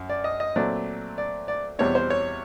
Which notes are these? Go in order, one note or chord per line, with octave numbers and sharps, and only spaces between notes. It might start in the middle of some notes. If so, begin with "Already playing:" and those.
Already playing: F#2
D5
D#5
D#5
A#2 F#3 A3 C4 D5
D5
D5
E2 B2 G3 C4 C#5
C5
C#5